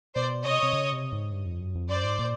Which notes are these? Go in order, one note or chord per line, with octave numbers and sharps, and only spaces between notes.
B2 C5 D5
C3 C#5 D#5
C3
C#3
C3
G#2
G2
F2
F#2
F2
F#2 C5 D5
G#2
A#2